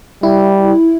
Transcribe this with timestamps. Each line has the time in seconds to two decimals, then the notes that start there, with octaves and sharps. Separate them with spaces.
0.23 G3 E4